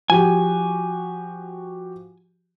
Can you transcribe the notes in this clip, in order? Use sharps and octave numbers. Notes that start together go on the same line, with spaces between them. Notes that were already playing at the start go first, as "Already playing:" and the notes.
F3 F#4 G4 G#5